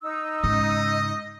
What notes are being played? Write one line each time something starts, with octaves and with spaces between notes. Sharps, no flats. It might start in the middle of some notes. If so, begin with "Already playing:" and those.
D#4 E6
G#2 C#3 D#5